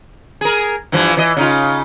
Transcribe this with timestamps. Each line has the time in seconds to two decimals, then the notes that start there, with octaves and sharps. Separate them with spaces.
0.41 G#4 A#4
0.92 G2 E3 F3
1.17 E3 D#5
1.36 C#3 D#4 F4